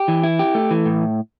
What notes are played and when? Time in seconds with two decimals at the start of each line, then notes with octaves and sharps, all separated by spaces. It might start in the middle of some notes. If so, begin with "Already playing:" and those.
Already playing: G4
0.08 E3
0.23 E4
0.39 G4
0.55 A3
0.71 E3
0.86 A2